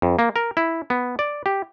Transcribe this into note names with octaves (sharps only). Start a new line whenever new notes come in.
F2
A#3
A#4
E4
B3
D5
G4